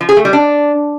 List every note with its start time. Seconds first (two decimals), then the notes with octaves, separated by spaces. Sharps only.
0.01 F3
0.09 G#4
0.17 A3
0.25 G3
0.33 D4